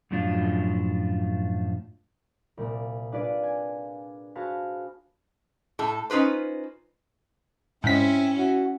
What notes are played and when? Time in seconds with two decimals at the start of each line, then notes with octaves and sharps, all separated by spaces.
0.11 F#2 A2 F3 D4 F4
2.57 C2 A#2 A#3
3.12 D4 F4 G#4 B4 D5
3.43 G#5
4.35 F#4 G#4 C5 F5 A5 B5
5.79 A2 A4
6.10 C#4 D#4 F4 B4 C5
7.84 G#2 C4 C#4 E4 B6
8.38 F#4